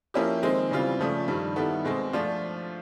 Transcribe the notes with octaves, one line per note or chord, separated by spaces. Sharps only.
F3 A#3 C#4 E4 G4
D#3 G#3 C4
C#3 E3 G3 C4 F4
C#3 F3 A3 D4
G2 D#3 G3
D#3 G3 B3 E4 A4
B2 G#3 C4
F3 A3 D4 F4